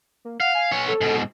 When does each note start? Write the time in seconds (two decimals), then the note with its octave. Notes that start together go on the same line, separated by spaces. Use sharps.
0.25 A#3
0.40 F5 F#5
0.55 G#5
0.71 B3 C#5
0.88 A4
1.01 G#2 B2